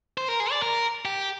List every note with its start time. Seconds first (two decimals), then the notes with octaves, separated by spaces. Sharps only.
0.18 C5
0.28 A#4
0.40 G#4
0.51 D5
0.62 A#4
1.05 G4